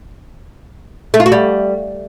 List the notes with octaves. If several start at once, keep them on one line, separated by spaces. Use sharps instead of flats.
A3
F4
F#4
G3